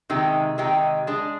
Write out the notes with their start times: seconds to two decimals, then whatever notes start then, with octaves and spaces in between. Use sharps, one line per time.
0.10 C3 D#3 G#3 D#4 G4
0.58 C3 D#3 G#3 D#4 G4
1.07 G#3 D4 G#4